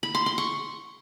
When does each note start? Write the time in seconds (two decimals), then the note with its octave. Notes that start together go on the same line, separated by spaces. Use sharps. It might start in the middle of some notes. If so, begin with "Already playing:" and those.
0.03 B5
0.15 C6
0.26 C6
0.38 C#6